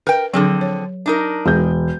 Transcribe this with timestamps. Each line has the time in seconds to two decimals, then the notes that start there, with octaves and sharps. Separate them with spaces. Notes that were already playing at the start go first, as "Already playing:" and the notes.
0.07 A#4 B4 G5
0.33 D3 F3 F#3 C4 G#4
0.61 C#5
1.06 D4 D#4 A#4
1.46 E1 G#4 G6